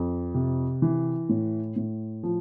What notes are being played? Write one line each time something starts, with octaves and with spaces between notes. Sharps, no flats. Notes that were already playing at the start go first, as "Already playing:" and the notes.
Already playing: F2
C3
E3
A2
A2
F3